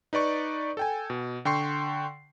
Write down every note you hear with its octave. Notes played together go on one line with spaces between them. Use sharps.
D#4 B4 D5 C#6
A4 G5 G#5
B2
D3 G5 C6 C#6 C7